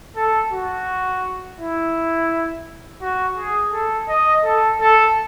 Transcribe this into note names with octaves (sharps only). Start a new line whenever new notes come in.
A4
F#4
E4
F#4
G#4
A4
D#5
A4
A4